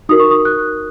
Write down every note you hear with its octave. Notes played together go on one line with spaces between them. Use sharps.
D#4 F#4 A#4 D#6
C#6
D#6
F#6